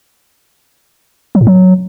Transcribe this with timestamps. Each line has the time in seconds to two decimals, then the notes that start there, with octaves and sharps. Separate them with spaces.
1.35 F#3
1.41 A2
1.47 F#3